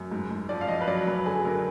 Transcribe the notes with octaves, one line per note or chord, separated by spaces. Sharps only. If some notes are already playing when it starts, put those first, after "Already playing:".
Already playing: F#2
G#2
G#2
F3 D5
F5
F3 D#5
B4
F#3 D5
F#2 B4
D3 G#4
F#2 A#4